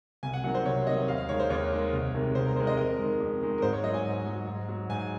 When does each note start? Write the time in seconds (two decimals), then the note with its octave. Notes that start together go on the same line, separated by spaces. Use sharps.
0.23 C2 G#5
0.33 F#5
0.44 C3 D#3 F#3 F#5
0.55 C5
0.65 C2 C#5
0.86 C3 D#3 F#3 D#5
1.08 D#2 F5
1.18 F5
1.29 D#3 G#3 C#5
1.40 C5
1.50 D#2 C#5
1.72 D#3 G#3
1.93 C2
2.14 C3 D#3 G#3
2.35 C2 C5
2.46 A#4
2.56 C3 D#3 G#3 C5
2.67 D#5
2.77 F2 A#4
2.98 D#3 G#3
3.20 F2
3.41 D#3 G#3
3.58 A#4
3.62 G#2 C5
3.73 C#5
3.84 F#3 D#5
3.94 G#5
4.05 G#2
4.26 F#3
4.47 G#2
4.69 F#3
4.89 G#2 G#5